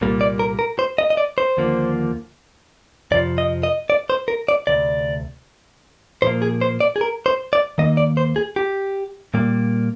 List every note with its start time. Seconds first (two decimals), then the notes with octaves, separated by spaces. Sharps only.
0.01 C2 A#2 G3 A#3
0.21 D5
0.39 A#4
0.59 A#4
0.79 C5
0.98 D#5
1.10 D#5
1.17 D5
1.38 C5
1.57 D#2 D3 F3 A#3
3.11 F2 C3 F3 D5
3.38 D#5
3.63 D#5
3.90 D5
4.10 C5
4.28 A#4
4.48 D5
4.67 D2 C3 D5
6.22 A#2 F3 A#3 C5
6.42 G#4
6.61 C5
6.81 D5
6.96 G#4
7.01 A#4
7.26 C5
7.53 D5
7.78 D#2 D#3 A#3 D#5
7.97 D5
8.17 C5
8.36 G#4
8.56 G4
9.34 A#2 G3 A#3